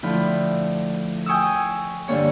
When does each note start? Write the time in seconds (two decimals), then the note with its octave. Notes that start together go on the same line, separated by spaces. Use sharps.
0.03 A2 D3 F3 E4 F4
1.26 G5 G#5 C#6 D#6 E6
2.08 G2 D3 A#3 C#5